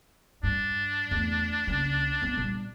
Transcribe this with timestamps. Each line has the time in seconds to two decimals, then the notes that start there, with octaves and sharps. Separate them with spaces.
0.43 G2 D4
1.11 E2 A3
1.67 C#2 A#3
2.22 G#3 B3
2.37 A#2 G3